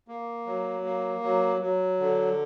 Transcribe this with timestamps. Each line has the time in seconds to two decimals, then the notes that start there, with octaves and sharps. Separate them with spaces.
0.08 A#3
0.46 F#3
0.85 A#3
1.23 F#3
1.62 F#3
2.00 D3